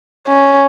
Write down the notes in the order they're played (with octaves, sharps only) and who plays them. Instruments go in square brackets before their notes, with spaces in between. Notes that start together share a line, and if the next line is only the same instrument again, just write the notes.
[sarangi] C#4